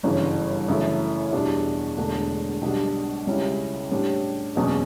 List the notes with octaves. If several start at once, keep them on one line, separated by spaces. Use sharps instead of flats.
G1 F#2 C#3 E3
F#2 C#3 E3 A3 E4
E2 B2 G3 D4
E1 E2 D3 A3 D4
B1 B2 G3 D4
C#2 C#3 G3 C#4 E4
A2 G3 D4
F#1 E2 B2 F#3 C#4